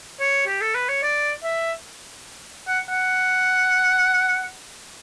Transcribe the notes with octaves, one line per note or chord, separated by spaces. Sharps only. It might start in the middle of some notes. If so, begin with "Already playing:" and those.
C#5
G4
A4
B4
C#5
D5
E5
F#5
F#5